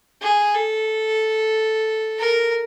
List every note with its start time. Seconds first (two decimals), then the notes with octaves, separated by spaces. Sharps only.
0.22 G#4
0.55 A4
2.18 A#4